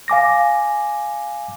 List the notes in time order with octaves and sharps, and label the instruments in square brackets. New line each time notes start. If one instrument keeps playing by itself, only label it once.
[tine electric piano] F5 G#5 D6 A#6